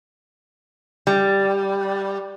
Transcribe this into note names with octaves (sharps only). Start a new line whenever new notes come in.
G3